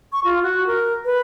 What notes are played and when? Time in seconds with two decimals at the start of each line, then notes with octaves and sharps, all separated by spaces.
0.12 C#6
0.24 F4
0.43 F#4
0.67 A#4
1.05 B4